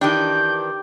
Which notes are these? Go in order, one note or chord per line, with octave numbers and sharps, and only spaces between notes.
D#3 E3 D4 G4 G6